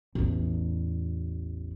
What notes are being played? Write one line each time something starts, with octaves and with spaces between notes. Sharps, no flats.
A1 E2